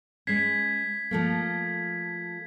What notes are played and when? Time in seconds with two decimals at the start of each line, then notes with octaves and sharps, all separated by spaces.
0.27 G#3 C#4 G#6 B6 C7
1.11 F3 A3 A#3